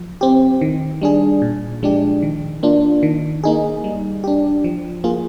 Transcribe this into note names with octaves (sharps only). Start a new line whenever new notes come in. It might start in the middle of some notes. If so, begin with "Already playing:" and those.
Already playing: F3
C4 G4
D#3
G3 D4 G#4
A#2
F3 G#3 D4 G4
D#3
A#3 D4 F4
D#3
A#3 D#4 G#4
G3
D4 G4
F3
A#3 F4 G#4